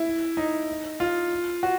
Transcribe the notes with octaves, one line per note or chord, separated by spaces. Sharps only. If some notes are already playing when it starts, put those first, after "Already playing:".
Already playing: E4
D#4
F4
F#4